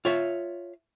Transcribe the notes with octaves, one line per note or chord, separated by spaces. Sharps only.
F4 C#5 E5